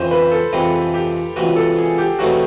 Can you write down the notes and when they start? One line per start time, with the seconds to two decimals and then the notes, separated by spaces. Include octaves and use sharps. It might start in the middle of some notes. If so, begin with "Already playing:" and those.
Already playing: F2 C#3 E3 G#3 C5
0.11 B4
0.31 A4
0.53 F2 C3 E3 G#3 C4
0.94 G4
1.36 C#2 C3 E3 F#4
1.56 A4
1.78 G#4
1.98 G4
2.19 E2 B2 F#3 A3 C4 F#4